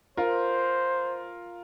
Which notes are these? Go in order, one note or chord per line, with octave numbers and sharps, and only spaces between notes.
F4 A#4 C5